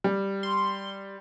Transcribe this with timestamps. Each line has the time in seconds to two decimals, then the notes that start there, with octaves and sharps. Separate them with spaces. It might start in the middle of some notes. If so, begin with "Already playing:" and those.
0.04 G3
0.43 C6